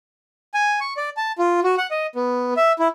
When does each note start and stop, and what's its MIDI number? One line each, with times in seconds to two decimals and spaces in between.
0.54 0.80 80
0.81 0.94 85
0.97 1.10 74
1.17 1.32 81
1.38 1.60 65
1.64 1.75 66
1.78 1.87 78
1.91 2.07 75
2.15 2.54 59
2.57 2.72 76
2.79 2.88 64